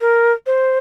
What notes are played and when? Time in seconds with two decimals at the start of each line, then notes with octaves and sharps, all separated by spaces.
0.01 A#4
0.46 C5